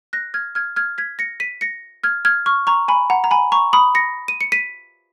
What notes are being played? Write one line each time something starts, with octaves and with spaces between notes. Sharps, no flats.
F#6 A#6
F6 G#6
F6 G#6
F6 G#6
G#6 B6
A#6 C#7
B6 D#7
A#6 C#7
F6 G#6
F6 G#6
C#6 F6
A#5 C#6
G#5 B5
F#5 A#5
A#5
G#5 B5
A#5 C#6
B5 D#6
A#6 C#7
D#7
C#7
B6 D#7